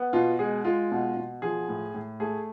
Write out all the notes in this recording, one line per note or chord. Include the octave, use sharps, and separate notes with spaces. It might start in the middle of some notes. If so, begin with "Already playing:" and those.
Already playing: B3
B2 F4
G#3 G#4
G#3 F4
B2
B2
F3 G#4
A2
A2
A3 G#4